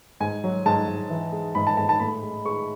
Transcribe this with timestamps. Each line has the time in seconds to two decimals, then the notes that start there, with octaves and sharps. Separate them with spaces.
0.20 G#2 G#5
0.44 F#3
0.66 G#2 A5
0.87 G#2
1.10 E3
1.32 G#3
1.55 G#2 B5
1.67 A5
1.77 G#2 A5
1.89 A5
2.00 A2 B5
2.23 G#3
2.45 G#3 C#6